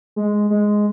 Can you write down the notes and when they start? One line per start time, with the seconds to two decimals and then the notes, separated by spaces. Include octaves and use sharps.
0.16 G#3
0.50 G#3